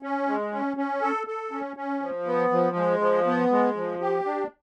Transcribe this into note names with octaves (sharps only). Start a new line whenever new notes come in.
C#4
G#3
C#4
C#4
A4
A4
C#4
C#4
F3
B3
F3
G#3
F3
B3
G#3
F3
G4
D4